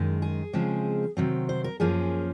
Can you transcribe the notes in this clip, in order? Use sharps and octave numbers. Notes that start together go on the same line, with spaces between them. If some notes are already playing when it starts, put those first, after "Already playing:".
Already playing: F#2 D#3 G#3
G#4
C#3 F3 G#3 C4
C3 D#3 F#3 C4
C5
A#4
F#2 F3 A#3 C#4 G#4